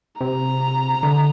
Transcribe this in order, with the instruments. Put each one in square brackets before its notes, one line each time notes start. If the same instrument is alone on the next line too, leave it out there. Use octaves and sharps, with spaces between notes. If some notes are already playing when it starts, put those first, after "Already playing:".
[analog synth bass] C3 [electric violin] A#5
[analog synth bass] D3